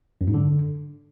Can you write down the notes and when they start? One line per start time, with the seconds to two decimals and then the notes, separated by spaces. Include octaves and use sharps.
0.21 F#2
0.27 G#2
0.34 D3